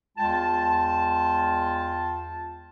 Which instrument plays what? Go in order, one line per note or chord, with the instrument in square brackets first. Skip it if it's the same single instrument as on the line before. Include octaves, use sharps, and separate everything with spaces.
[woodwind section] E2 G#3 F4 G5 A5